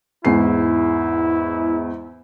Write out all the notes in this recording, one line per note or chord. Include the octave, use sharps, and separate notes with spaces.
E2 G#2 E4 C7